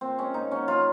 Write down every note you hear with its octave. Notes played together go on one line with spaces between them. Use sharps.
A#2 C4
G#3 C#4
A#2 D#4
F#3 C#4
F#3 F4